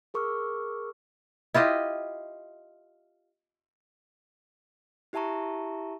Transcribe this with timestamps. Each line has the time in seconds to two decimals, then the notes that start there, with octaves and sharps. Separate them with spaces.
0.14 G#4 A#4 C#6 D6 E6 F6
1.54 E4 F4 G4 D#5
5.13 E4 G4 E5 A5 A#5 C#6